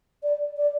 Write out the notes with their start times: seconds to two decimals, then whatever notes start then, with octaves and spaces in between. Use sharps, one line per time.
0.23 D5
0.57 D5